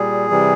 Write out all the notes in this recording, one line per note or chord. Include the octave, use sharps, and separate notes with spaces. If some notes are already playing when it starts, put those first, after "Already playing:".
Already playing: A#2 G3 G#4
C3 E3 G3